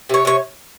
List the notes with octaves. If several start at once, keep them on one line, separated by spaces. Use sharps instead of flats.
C3 C#5
C3 C#5